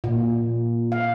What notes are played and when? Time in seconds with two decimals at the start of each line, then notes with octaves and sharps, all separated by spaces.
0.04 A#2
0.92 F5